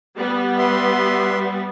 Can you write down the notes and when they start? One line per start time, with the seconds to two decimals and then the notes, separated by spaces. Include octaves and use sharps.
0.18 G3 B3
0.58 B4 E5 C6